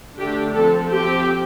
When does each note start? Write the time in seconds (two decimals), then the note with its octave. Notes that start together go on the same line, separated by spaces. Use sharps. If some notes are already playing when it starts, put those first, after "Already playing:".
0.17 D3 A3 D4 G4
0.54 F3 C4 A4
0.91 F3 C4 G4